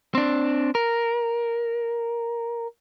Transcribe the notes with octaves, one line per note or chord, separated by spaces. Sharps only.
C4 D4
A#4